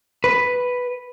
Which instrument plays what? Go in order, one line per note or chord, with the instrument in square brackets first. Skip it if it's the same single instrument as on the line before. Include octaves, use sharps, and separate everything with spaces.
[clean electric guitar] B4